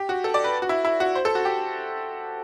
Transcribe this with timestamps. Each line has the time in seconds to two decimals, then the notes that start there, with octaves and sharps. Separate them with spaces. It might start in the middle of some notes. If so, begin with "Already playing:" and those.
Already playing: G4
0.09 F#4
0.24 A4
0.34 D5
0.44 B4
0.62 F#4
0.69 E4
0.85 E4
1.00 F#4
1.15 C5
1.25 A4
1.35 F#4
1.45 G4